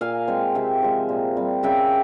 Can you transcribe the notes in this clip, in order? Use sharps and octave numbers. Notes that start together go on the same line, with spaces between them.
A#2 F5 G#5
G#3 C4
C3 E5 G5
F3 G#3
A#2
G3 C4
C#3 E5 G5